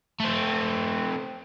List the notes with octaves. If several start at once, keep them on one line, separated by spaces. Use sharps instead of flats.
A3 C4